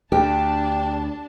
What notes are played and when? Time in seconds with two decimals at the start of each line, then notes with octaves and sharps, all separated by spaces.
0.12 D2 D4 G4 A5